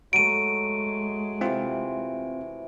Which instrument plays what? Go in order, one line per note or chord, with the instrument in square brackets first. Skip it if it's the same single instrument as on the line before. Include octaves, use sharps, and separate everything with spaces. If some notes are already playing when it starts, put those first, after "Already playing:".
[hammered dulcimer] F#3 A3 [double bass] G#3 [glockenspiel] D7 D#7
[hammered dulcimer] C3 E3 [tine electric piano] C4 F4